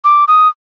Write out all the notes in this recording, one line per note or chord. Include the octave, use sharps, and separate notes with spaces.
D6
D#6